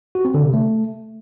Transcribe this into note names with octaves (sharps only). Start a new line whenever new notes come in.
F#4
C4
D3
C3
A3